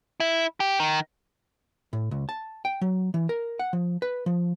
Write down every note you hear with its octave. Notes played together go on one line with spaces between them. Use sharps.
E4
G4
D#3
A2
C#2
A5
G5
F#3
E3
A#4
F#5
F3
B4
F3